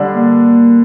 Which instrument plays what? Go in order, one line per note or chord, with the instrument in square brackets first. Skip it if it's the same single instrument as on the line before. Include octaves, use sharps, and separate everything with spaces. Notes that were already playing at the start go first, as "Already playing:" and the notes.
Already playing: [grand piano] D3 G3 D4
[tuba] A#3